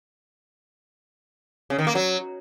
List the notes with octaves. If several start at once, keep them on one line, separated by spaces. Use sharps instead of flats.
C#3
D#3
A#3
F#3